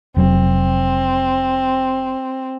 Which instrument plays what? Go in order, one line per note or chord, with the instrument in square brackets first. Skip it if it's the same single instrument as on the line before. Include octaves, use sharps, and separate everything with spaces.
[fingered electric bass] F1 F#3 [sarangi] C4